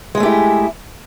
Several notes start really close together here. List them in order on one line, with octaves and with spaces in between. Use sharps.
G#3 G#4 A3 G4 E4